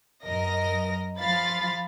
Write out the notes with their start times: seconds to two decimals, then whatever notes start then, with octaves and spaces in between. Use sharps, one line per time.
0.25 F#2 A#4 D#5 A#6
1.18 F3 F5 B5 A6